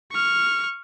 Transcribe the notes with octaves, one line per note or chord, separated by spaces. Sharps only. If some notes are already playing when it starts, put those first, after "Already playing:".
C#6 F6